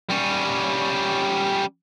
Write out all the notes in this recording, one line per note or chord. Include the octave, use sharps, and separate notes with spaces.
G3 C#4